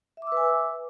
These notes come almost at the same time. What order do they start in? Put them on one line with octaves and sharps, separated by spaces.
E5 D6 E6 B4 G#5